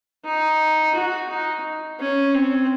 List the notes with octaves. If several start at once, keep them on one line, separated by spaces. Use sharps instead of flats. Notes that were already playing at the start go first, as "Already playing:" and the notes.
D#4
F#4
D#4
C#4
C4